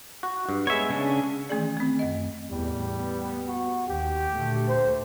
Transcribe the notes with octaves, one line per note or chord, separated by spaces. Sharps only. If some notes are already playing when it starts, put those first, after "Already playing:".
F#4
G2
G#3 B3 C#5 E5
C#3 C#4 D4
D#3 E3 A3 C#4 G#4 D5
A3 C4
F#2 D#5
E2 A2 G3
B3
F#4
D#2 G4
D2 A#2 A3
C5